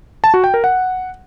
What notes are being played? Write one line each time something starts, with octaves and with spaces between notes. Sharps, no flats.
A5
F#4
G5
A#4
F#5